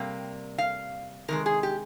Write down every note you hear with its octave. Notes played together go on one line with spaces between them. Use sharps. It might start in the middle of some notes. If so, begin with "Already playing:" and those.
Already playing: C3 G3 A#3 G5
F5
C3 D#3 G#3 A#4
G#4
G4